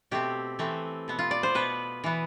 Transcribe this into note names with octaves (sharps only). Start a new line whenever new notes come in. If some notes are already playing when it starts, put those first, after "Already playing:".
B2 A3 C4 G4
E3 A3 C4
B2 B3
F4
D5
C5
B2 B3 B4
E3 B3